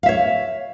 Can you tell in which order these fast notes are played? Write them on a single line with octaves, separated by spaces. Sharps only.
F5 E5 C#5